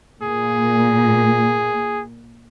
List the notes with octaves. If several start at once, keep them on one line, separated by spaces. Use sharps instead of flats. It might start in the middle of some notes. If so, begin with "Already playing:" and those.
A#2 G#4